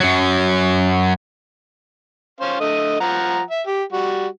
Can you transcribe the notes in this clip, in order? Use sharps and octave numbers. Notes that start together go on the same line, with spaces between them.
F#2 F#3
C#4 C5 F5
D3 A3 D#5
F3 F#5 A#5
E5
G4
G3 F#4